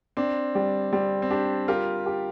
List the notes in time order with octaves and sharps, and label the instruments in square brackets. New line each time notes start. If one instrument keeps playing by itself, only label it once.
[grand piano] C4 [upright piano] D4
[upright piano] G3
[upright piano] G3 [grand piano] C4
[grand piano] C4
[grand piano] D4 [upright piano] G4
[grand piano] F4 A#4 [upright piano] G4
[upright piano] G4